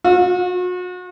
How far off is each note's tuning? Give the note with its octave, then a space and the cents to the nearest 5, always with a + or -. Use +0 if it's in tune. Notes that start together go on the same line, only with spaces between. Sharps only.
F#4 -40